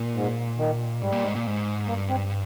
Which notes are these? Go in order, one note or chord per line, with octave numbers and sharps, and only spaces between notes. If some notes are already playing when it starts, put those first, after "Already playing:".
Already playing: A#2
G#2
D#3
G#2 G3
A#2
G#2
A#2
G#2
G2 A#3
C4